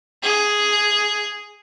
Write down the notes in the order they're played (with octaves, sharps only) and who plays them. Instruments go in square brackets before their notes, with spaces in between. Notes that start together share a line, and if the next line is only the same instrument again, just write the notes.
[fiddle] G#4